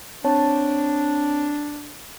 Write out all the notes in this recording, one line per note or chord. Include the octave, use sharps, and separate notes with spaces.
C4 D4 C#5 A5